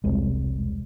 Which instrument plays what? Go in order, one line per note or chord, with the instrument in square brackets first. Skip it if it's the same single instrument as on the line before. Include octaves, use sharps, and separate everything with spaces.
[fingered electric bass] E1 C2 C3 G#3